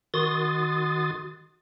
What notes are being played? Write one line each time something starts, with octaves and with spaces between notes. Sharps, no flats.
D#3 F#4 C6 D#6 A6